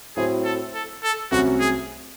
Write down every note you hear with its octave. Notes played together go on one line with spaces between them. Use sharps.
A2 F#3 C4 E4 G#4
A4
A4
A4
C2 C3 F#3 A3 C#4 F#4
G#4